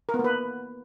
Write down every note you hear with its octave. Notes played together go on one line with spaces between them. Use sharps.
A#4
B3
A#3
B4